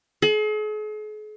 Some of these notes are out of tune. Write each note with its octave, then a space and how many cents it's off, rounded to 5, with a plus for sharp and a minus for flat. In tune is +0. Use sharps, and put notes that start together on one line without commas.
G#4 +45